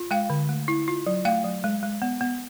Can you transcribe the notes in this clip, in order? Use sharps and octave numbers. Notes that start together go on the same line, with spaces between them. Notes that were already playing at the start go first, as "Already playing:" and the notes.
Already playing: F4
G#3 F5 G5
D3
A3
E4
F4
F#3
A3 F5 G5
F#3
G#3
G#3
B3
B3